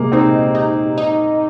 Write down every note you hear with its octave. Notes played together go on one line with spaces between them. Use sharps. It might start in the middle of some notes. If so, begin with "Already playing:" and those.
Already playing: C3 G#3 A#3
C4 D#4
D#4
D#4